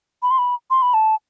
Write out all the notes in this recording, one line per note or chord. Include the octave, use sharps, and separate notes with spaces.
B5
C6
B5
C6
B5
A5